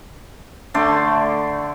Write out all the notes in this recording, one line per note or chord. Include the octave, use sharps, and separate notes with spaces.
D3 A3 D5 C6